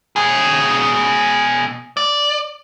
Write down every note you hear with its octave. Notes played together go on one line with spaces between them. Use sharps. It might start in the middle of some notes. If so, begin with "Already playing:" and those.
B2 G#4
D5